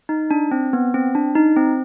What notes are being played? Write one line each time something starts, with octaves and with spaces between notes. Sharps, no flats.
D#4
D4
C4
B3
C4
D4
D#4
C4